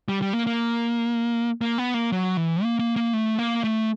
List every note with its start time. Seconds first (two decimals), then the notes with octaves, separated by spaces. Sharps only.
0.08 G3
0.22 G3
0.33 A#3
0.47 A#3
1.61 A#3
1.78 B3
1.94 A#3
2.12 F#3
2.37 E3
2.63 A#3
2.79 A#3
2.96 A#3
3.13 A3
3.39 A#3
3.64 A3